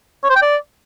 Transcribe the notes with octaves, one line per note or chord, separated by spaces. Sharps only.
C#5
C5
G5
D5